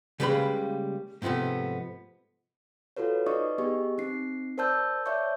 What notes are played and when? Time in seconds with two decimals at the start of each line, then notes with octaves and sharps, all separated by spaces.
0.20 C#3 G3 G#3 A#3 B4 B5
1.22 G#2 C3 F3 A3 B3
2.97 F4 F#4 A4 B4 C#5
3.26 D#4 B4 D5 D#5 C#6 D#6
3.58 B3 G4 G#4 D#5 C#6
3.98 C4 D#4 C7
4.58 A#4 C5 D5 A5 E6 G6
5.06 C#5 D5 E5 A5 C#6 G6